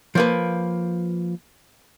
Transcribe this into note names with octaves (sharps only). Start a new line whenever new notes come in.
F3 A#3 B4